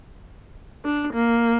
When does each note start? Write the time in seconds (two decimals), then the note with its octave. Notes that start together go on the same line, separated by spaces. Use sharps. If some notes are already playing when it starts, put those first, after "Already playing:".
0.85 D4
1.13 A#3